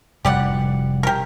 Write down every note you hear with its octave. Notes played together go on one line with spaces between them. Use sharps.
F1 G3 G4 D5 F#5
G4 A#4